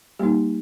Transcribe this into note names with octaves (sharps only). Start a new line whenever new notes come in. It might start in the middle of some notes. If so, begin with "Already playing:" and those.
G3 A#3 D#4 G4